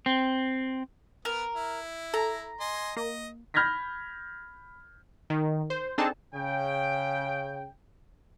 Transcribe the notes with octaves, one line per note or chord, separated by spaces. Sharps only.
C4
B3 A#4
E4
A4 A#5
D#5 G#5 C6
A#3 D#5
B5 F6 G6 G#6 A#6 B6
D#3
C5
C4 D4 D#4 G#4 A4 A5
C#3 G5